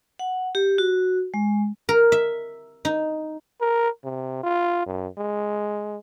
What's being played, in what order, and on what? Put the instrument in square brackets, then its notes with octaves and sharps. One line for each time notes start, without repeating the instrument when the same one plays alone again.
[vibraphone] F#5
G4
F#4
G#3
[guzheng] A#4
E5
D#4
[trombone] A#4
C3
F4
F#2
G#3